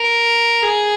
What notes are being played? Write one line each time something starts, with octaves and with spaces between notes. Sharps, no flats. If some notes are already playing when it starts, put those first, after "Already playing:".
Already playing: A#4
G#4